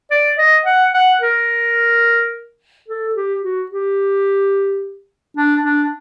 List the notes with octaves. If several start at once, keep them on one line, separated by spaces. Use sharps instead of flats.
D5
D#5
F#5
F#5
A#4
A4
G4
F#4
G4
D4
D4